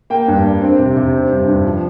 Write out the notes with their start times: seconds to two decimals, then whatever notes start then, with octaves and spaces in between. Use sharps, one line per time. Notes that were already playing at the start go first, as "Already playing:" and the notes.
0.10 A#3 G5
0.28 G2
0.45 D4
0.62 C4
0.79 C3
0.97 C3
1.14 C4
1.30 G2
1.48 G2
1.65 F3